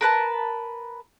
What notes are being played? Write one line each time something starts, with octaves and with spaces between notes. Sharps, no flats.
A#4 B4 A5